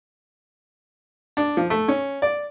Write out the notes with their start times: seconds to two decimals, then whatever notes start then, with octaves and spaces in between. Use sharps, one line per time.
1.37 D4
1.57 F3
1.70 A3
1.88 C#4
2.22 D5